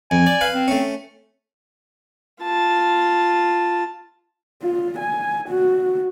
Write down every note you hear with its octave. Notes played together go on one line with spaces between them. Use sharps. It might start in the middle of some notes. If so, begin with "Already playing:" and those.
F2 G#5
D5
B4 F5
C4
A3 C#4
F4 A5
F4
G#5
F#4